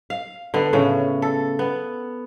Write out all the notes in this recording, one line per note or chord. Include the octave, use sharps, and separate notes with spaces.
F5
D3 B3
A2 C#3
A4
B3